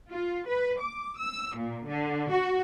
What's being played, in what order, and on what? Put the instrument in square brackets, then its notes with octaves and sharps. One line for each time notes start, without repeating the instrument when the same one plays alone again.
[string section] F4
B4
D6
E6
A#2
D3
F#4